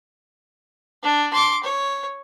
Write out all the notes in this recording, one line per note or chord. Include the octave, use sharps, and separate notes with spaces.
D4
C6 D6
C#5